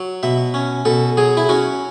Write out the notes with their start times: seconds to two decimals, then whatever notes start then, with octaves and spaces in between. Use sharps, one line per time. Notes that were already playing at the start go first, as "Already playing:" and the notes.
Already playing: F#3
0.23 B2 E5
0.54 C#4
0.85 B2 A4
1.17 F#3 G#4
1.37 E4
1.49 C#4 F#4